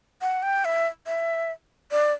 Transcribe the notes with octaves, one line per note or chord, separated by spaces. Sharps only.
F#5
G5
E5
E5
D5